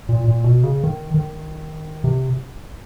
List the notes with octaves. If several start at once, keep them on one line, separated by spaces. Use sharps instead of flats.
A#2
A#2
B2
C#3
D#3
D#3
C3